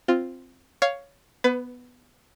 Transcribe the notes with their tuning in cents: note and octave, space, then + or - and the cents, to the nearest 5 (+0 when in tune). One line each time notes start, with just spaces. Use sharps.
C4 +0 F4 +0
C#5 +10 F5 +0
B3 +0 B4 +25